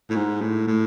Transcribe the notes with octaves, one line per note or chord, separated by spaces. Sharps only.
A2
G#2
A2
A2